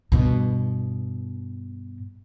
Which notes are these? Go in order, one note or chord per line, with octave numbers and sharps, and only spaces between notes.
G2 B2